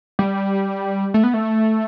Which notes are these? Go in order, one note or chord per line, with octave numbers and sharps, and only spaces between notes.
G3
A3
B3
A3